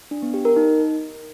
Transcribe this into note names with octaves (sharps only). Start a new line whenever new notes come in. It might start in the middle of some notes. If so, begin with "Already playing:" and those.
D4
B3
G4
A#4
D#4